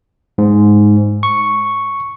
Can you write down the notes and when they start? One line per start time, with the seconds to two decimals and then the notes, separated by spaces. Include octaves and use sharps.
0.38 G#2
1.23 C#6